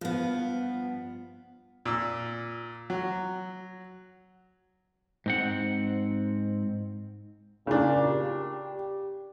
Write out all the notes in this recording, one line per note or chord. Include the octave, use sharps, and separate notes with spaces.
G2 F3 B3 F4
A#2 E6
F#3
G#2 C4 F#5
A#2 C#3 D4
G4